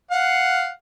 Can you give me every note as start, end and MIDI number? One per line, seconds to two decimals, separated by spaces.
0.11 0.70 77
0.11 0.70 78